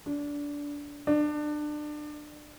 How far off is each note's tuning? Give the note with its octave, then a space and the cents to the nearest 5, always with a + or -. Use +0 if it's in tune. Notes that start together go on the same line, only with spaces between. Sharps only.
D4 -20
D4 +25